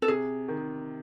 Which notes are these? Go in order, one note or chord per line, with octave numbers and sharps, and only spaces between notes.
A4
C3 G#4
D#3